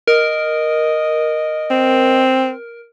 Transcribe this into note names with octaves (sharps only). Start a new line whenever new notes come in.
A#4 D#5
C4